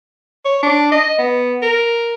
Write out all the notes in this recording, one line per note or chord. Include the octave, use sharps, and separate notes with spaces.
C#5
D4
D#5
B3
A#4